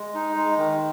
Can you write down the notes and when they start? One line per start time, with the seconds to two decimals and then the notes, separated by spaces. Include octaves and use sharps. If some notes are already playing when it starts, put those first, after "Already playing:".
Already playing: G#3
0.15 D#4
0.37 G#3
0.58 D#3